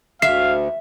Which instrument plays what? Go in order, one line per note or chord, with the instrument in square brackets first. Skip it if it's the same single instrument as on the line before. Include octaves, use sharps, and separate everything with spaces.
[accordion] D2 [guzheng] E5 [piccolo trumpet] F5 [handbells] C7